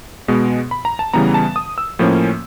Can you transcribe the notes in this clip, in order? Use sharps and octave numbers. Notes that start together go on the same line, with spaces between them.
B2 G#3 B3
B5
A#5
A5
C#3 E3 G3 B3 A#5
A5
D#6
E6
A2 F3 A#3 C#4